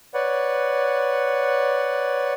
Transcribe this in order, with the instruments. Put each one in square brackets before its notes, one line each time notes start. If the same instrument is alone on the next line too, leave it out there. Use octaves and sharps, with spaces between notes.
[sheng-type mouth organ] B4 C#5 D5 F#5